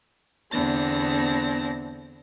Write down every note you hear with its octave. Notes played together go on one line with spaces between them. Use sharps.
E2 D3 B3 C4 D4 A#6